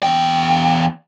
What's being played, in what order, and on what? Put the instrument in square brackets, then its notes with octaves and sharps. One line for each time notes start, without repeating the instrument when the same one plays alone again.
[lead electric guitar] E2 G5